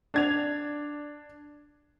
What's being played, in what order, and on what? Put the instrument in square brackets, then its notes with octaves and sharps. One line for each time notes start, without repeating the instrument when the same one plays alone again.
[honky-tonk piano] D4 G#6 F7